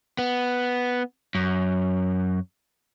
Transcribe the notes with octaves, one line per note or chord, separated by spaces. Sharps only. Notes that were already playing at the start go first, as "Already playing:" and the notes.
B3
F#2